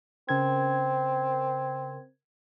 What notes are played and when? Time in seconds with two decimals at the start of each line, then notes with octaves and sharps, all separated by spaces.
0.29 C#3 C4 A#4 G#6